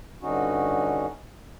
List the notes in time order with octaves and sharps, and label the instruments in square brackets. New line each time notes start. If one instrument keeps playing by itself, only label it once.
[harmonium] G2 D3 C#4 D#4 F#4